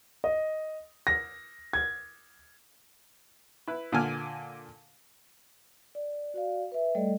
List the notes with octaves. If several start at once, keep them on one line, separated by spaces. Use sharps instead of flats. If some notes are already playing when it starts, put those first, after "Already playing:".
D#5
A#6
G#6
E4 B4
A#2 D3 G#5 F6
D5
F#4 D5 F5
B4 E5
G3 A3 A4 D5 D#5